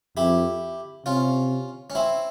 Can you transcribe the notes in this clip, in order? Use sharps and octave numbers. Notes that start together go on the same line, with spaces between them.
F2 E4 G4
C3 C#4 F4
C#4
C4 E4